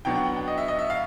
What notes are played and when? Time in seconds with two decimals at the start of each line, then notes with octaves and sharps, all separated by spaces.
0.05 B2 F#3 B3 D4 G5
0.15 F#5
0.26 G5
0.37 G5
0.48 D#5
0.58 E5
0.68 D#5
0.79 E5
0.90 F5